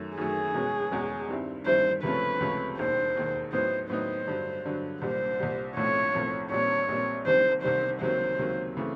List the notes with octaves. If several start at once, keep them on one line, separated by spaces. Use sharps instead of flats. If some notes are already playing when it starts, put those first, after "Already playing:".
Already playing: F#2 D#3 F#3 A3
F#2 D#3 F#3 A3 G#4
E2 B2 G#3 C#4 F#4
E2 B2 G#3 C#4 F#4
G2 D#3 G3 C4 E4
G2 D#3 G3 C4 E4 C5
C#2 C3 F3 A3 C#4 B4
C#2 C3 F3 A3 C#4
E1 D#2 D#3 C5
E1 D#2 D#3
A2 F#3 B3 D#4 C5
A2 F#3 B3 D#4 C5
G2 D3 F#3
G2 D3 F#3
C2 A#2 G3 C5
C2 A#2 G3
B1 A2 F3 A3 C4 C#5
B1 A2 F3 A3 C4
A#1 A#2 G3 C4 C#5
A#1 A#2 G3 C4
C2 C3 D#3 G3 C5
C2 C3 D#3 G3 C5
C#2 C3 D#3 F#3 A#3 C5
C#2 C3 D#3 F#3 A#3
C#3 E3 A3 C4